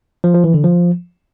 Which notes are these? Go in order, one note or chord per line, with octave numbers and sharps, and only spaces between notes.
F3
F3
E3
D3
F3